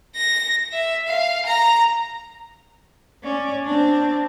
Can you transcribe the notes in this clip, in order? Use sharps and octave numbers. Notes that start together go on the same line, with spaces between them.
A#6
E5
F5
A#5
C#4 D5
C4 D4